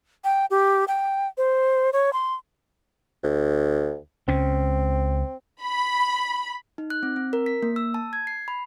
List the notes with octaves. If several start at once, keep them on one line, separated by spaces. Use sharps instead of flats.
G5
G4
G5
C5
C#5
C6
D2
C#2 C4 C#4
B5
D#4
F#6
C4
C4
A#4
B6
A#3
E6
A5
G#6
C7
B5